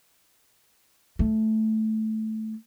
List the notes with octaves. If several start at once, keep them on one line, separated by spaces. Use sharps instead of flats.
A3